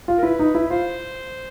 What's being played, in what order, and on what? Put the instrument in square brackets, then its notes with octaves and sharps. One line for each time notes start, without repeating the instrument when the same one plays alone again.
[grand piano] F4
[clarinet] A#4
[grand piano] E4 [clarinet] B4
[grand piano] D#4
E4
[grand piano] F4 [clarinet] C5